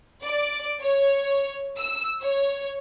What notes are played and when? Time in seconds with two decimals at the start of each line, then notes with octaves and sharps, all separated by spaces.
0.24 D5
0.81 C#5
1.79 E6
2.22 C#5